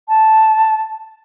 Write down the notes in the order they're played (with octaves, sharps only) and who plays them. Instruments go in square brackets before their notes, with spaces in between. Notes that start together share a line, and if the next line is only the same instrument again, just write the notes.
[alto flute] A5